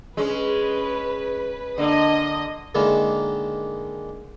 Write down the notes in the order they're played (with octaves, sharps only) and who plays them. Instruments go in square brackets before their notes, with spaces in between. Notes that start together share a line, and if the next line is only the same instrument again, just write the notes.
[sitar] G#3 C#4 [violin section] B4
[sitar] D3 A#3 [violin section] D#5 D#6
[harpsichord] D3 D#3 G#3 A#3 E4